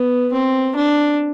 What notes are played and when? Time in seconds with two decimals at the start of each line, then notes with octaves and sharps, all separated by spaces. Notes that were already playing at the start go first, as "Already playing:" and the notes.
Already playing: B3
0.33 C4
0.76 D4